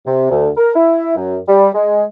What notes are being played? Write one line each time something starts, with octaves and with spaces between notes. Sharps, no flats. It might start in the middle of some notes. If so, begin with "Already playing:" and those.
C3
D2
A#4
E4
F#2
G3
G#3